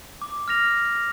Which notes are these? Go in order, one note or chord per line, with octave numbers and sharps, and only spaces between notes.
D6
F6 A#6 F7